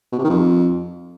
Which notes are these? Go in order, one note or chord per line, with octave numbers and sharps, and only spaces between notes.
B2
C3
D#3
F2